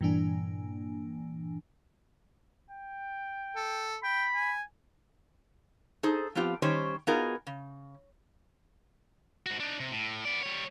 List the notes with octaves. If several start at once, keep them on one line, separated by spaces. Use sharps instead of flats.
G2 A#2 E3 A#3 D4 G#5
G5
A4
G5 B5
G#5
D#4 G#4 A4 C5
F3 B3 C4 F4 G4
D#3 G3 C#4 G4 C5 C#5
B3 D#4 F4 F#4 G#4 A#4
C#3
G#2 F#4
D4 D#4
C3
A2
B3 D5
G3 C#5